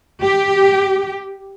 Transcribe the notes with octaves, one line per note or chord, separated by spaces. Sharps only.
G4